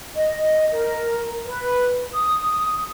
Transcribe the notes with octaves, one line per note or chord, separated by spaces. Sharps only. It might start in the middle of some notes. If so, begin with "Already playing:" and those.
D#5
A#4
B4
D#6